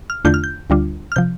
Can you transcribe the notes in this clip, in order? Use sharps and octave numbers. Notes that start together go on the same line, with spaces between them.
F6
E2 D3 A3 D4 F4 G6
F6
G6
D2 D3 G3 D4 F4
F6
C3 F3 G6